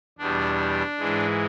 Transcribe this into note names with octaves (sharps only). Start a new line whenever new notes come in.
E2 B2 G3 D4
G#2 E3 G#3